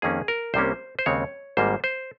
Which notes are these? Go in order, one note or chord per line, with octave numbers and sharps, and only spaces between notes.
F2 D#3 A#3 C#4 G#4
A#4
C2 C3 G3 A#3 C#4 C5
C5
D#2 C#3 G#3 C4 C#5
G#1 G#2 G3 A#3 C5
C5